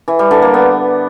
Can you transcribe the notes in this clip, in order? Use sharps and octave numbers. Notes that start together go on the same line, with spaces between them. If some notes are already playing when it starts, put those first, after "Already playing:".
E3
G3
D3
A#3
B3